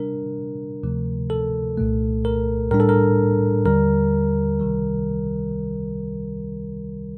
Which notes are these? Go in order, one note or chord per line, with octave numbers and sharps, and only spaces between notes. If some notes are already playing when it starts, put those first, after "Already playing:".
Already playing: C3 G3 D4 A#4
D2 C3 F3 A3
A4
C2 A#2 A3
A#4
A2 G3 D4 A#4
A4
A#4
D#2 D3 G3 A#4
C2 C3 D#3 G3